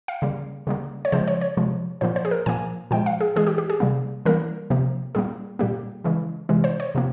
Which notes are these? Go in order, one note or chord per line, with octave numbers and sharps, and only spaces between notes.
F5
C#3 G3 A#3
C#3 G3 A#3
C#5
C#3 F3 G#3 C5
C#5
C#5
C3 F3 G#3
A#2 F3 A#3 C5
C5
G#4
A#4
A#2 F3 A#3 G#5
A#2 F3 G#3 G5
F5
G#4
E3 G#3 G#4
G4
G4
G#4
C3 G3 A#3
E3 G3 A#3 A#4
C3 F3 A#3
A#2 G3 A#3 G#4
A#2 G3 A#3 G4
C#3 E3 G#3
C3 E3 G#3
C5
C#5
C3 F3 A#3